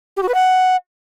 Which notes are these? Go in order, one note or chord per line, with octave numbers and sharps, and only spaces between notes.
G4
F#4
B4
F#5